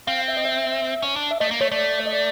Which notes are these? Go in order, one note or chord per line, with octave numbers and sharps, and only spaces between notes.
C4 F5
E5
D#5
E5
C#4
D4
E5
A3 D#5
A#3
A3 C#5
A3 D5
D#5
D5